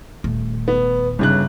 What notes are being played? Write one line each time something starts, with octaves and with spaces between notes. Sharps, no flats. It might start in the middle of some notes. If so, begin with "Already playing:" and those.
D#1 A3
B3
G1 C#3 F#6